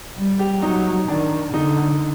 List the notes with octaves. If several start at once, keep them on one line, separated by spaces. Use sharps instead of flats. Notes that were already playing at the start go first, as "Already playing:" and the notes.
G3
G4
F#3 D#4
D#3 D4
D3 D#4